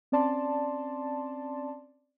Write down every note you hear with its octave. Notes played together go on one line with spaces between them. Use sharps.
C4 C#4 D5 A5 C6